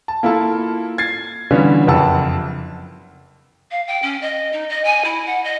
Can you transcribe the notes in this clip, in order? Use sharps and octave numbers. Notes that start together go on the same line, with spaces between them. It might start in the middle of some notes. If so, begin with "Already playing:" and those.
A5
A#3 E4 F4 A4 A5
G#6 A6 C7
D3 E3 G3 B3 C#4 F4
F#1 F2 F#5 A5 E6
F5
G5
C#4
D#5
D#4
D#5
G#5
E4
F#5
D#5